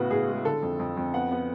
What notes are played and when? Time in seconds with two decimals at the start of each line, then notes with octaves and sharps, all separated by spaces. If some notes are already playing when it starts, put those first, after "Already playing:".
Already playing: A2 C#3 B3 F#4
0.11 A2 G#4
0.28 G#3
0.45 D3 A4
0.63 F2
0.80 F2
0.97 F2
1.14 B3 F#5
1.32 B3